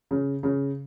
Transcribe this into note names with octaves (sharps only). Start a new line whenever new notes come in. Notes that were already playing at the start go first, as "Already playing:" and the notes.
C#3
C#3